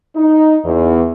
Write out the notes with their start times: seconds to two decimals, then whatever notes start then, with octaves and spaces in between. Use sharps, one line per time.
0.16 D#4
0.65 E2